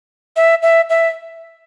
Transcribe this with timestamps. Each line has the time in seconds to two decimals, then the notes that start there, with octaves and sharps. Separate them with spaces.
0.36 E5
0.63 E5
0.90 E5